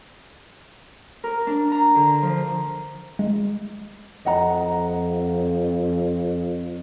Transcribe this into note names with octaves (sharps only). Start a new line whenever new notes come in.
A#4
D4
A#5
D3
F3
G#3
F2 D#5 F#5 A#5